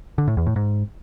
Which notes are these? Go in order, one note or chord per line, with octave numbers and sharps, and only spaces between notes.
D3
A2
E2
A2
G#2